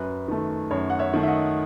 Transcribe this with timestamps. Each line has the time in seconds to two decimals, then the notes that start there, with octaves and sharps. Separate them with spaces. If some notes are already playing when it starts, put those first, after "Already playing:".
Already playing: F#2 B4
0.28 D#3 A3
0.71 F#2 C#5
0.90 F#5
0.99 C#5 E5
1.13 D#3 A3
1.23 E5
1.27 D#5 F#5